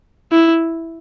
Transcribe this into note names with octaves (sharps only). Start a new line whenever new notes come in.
E4